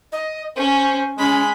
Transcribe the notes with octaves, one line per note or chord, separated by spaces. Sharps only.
D#5
C#4 C5
G#3 C#4 B5